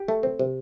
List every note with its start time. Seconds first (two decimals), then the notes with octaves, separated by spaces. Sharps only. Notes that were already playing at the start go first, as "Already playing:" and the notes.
Already playing: G4
0.08 A3
0.23 C4
0.39 C3